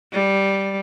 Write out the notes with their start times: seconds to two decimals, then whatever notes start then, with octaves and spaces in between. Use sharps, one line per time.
0.12 G3